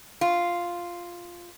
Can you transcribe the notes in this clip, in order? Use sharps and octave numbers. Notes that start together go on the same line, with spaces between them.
F4